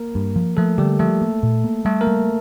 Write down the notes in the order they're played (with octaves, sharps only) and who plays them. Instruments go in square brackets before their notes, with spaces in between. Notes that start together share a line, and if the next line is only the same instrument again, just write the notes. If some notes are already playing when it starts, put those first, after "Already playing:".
Already playing: [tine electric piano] A#3 A#4
[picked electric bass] G2
F3
[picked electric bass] F3 [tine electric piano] A3 A4
[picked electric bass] D3 [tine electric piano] G3 G4
[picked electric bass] F3 [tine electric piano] A3 A4
[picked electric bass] A#3
A#2
A#3
[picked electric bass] G3 [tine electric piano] A3 A4
[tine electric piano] A#3 A#4
[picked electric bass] G3